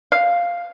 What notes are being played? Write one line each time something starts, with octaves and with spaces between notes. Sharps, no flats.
F5